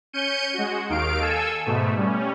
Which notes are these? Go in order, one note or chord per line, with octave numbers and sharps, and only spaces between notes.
C#4 G6 C#7 D#7
G#3 F#4
D#2 D#3 F5 D7
A4 G#5 E6
G#2 B2 A3
G3 C#4